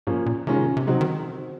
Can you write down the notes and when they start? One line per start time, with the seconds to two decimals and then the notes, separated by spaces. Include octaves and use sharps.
0.07 G#2 F3 A#3 C#4
0.26 A#2
0.47 C3 D#3 G#3 C#4 F4
0.77 C3
0.87 C#3 F#3 C4 D#4 F#4
1.01 D#3